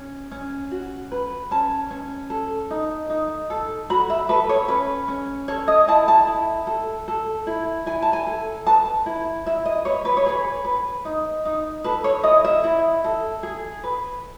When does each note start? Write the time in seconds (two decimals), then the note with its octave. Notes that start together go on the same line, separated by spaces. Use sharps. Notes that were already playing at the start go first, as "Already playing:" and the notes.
Already playing: C#4
0.31 C#4
0.71 F#4
1.12 B4
1.51 C#4 A5
1.91 C#4
2.30 A4
2.70 D#4
3.10 D#4
3.50 A4
3.90 F#4 B5
4.10 E5
4.29 A4 B4
4.49 C#5
4.68 C#4 B4
5.08 C#4
5.48 A4 C#5
5.68 D#5
5.88 E4 A5
6.08 A5
6.27 E4
6.67 A4
7.08 A4
7.47 E4
7.86 E4 G#5
8.02 A5
8.13 G#5
8.27 A4
8.66 B4 A5
9.06 E4
9.46 E4 E5
9.65 D#5
9.85 B4 C#5
10.05 B4
10.17 C#5
10.26 G#4 B4
10.65 B4
11.05 D#4
11.45 D#4
11.84 A4 B4
12.04 C#5
12.23 E4 D#5
12.44 E5
12.64 E4
13.04 A4
13.43 G#4
13.84 B4